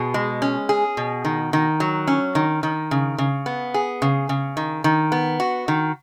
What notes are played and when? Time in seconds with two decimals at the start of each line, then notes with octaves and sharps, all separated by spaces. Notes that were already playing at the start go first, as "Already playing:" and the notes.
Already playing: B2 G#4
0.14 G#3
0.42 C#4
0.69 G#4
0.97 B2
1.25 D#3
1.53 D#3
1.80 F#3
2.07 C#4
2.35 D#3
2.63 D#3
2.91 C#3
3.18 C#3
3.46 B3
3.74 G#4
4.02 C#3
4.29 C#3
4.57 D#3
4.84 D#3
5.12 B3
5.40 F#4
5.68 D#3